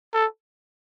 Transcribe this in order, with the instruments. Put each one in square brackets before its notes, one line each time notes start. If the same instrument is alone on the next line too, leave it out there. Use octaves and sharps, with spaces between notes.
[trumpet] A4